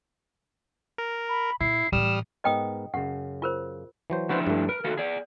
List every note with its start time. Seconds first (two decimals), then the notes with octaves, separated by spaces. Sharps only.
0.98 A#4
1.29 B5
1.61 A#2 E4 C7
1.92 A2 E3 G3 D#6 F6 E7
2.44 G#2 B3 A#4 D#5 G5 D#6
2.94 F#2 C#3 F#5
3.42 F4 A#4 C5
4.10 E3 F#3 C5
4.29 F3 D4 E4 F#4 B4 C5
4.47 G2 A3
4.69 A#4 B4
4.84 D#3 F#4 A4 F5
4.97 G#4 D5